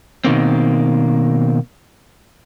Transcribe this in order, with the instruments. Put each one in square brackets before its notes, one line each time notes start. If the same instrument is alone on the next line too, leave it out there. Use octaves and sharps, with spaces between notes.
[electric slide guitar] B2 D#3 A#3 C4